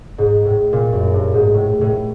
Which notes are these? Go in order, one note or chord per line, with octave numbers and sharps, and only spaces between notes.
G#2
A2
A#2
F#2
G2
G#2
A2
A2